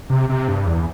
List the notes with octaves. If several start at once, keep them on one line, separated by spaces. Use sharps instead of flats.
C3
C3
G2
E2